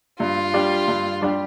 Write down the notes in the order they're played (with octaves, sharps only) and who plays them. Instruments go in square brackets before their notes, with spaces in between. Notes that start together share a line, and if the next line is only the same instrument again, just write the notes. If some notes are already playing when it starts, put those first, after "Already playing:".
[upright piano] G2 [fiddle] F4
[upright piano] G3 D4 G4
G2
G3 D4 G4